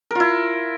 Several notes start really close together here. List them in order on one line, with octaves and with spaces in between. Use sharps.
A#4 F4 E4